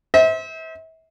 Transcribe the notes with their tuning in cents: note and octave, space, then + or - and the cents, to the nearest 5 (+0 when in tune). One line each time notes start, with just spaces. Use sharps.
C5 +0 E5 -35